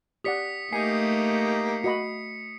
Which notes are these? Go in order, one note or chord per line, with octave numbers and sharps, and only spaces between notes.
G4 D5 F#5 D#6 B6 C#7
A3 A#3 D#4 G4 G#5 C7 C#7
F#4 D#5 B5 C#7